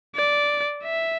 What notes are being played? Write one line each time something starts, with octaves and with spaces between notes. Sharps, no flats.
D5
E5